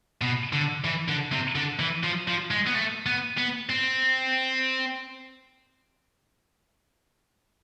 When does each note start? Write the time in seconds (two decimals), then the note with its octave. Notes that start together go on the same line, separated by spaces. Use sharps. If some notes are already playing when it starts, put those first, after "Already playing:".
0.22 B2
0.53 D3
0.85 E3
1.08 D3
1.32 C3
1.56 D3
1.80 E3
2.04 F3
2.28 F3
2.51 G#3
2.67 B3
2.75 A3
3.06 B3
3.38 B3
3.69 C4